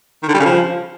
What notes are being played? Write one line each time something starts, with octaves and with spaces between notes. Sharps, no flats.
D#3
D3
G3
C#3
F3